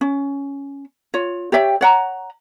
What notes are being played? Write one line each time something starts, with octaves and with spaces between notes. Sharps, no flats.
C#4
F4 C#5
G4 C#5 E5 G5
C#5 F#5 A#5